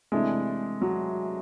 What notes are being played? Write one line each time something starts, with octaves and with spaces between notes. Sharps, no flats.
C3 E3 G#3 A3 D4
F#3